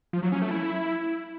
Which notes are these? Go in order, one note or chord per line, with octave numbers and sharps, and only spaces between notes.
F3
F#3
C#4
A3
E4